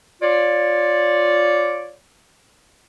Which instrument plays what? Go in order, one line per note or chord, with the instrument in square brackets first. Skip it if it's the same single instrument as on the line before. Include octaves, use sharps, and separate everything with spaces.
[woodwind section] F4 C#5 D5